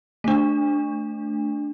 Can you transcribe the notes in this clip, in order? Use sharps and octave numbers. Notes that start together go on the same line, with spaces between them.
A3 D4